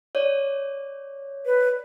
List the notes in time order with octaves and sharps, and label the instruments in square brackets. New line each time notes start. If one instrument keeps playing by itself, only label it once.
[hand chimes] C#5 D5
[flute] B4